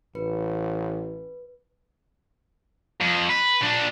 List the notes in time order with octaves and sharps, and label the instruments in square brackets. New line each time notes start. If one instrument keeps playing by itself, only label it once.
[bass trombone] A1 [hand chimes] B4
[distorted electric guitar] F2
B4
A#2 D4